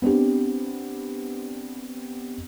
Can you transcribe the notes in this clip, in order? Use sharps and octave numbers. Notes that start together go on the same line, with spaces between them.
B3 C4 D4 G4